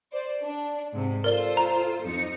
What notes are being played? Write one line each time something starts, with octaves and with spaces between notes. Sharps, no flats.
C5 D5
D4
G#2 C3
F4 A4 A#4 C5 D5 G7
A#5
F2 D#4 C#7